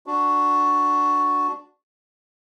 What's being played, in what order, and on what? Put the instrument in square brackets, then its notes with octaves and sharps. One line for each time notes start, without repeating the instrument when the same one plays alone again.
[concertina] D4 F#4